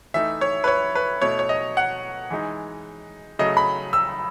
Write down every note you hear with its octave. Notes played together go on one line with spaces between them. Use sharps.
E3 A3 D#4 E5
C#5
B4
C#5
B4
B2 A3 E4 C#5
C#5
D#5
F#5
E3 G#3 D#4
C#3 F#3 A3 D#5
B5
E6